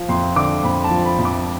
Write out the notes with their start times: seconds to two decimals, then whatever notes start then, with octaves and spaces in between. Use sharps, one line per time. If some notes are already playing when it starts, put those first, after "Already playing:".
Already playing: F3
0.09 F2 C6
0.36 D3 D6
0.64 F2 B5
0.84 A5
0.91 F3
1.05 B5
1.19 F2
1.25 D6